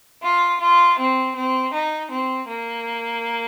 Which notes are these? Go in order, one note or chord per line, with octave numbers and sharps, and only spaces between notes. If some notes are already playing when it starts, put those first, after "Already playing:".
F4
F4
C4
C4
D#4
C4
A#3